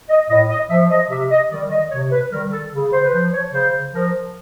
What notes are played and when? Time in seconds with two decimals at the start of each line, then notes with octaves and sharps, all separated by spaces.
0.09 D#5
0.29 A2 D#5
0.50 D#5
0.70 F3 E5
0.90 D#5
1.10 C3 E5
1.31 D#5
1.51 D#3 G3 D5
1.71 D#5
1.91 C3 C#5
2.12 B4
2.31 D#3 G3 A#4
2.52 A4
2.73 C#3
2.92 C5
3.05 B4
3.13 F3 C5
3.33 C#5
3.53 C#3 C5
3.93 F3 A#4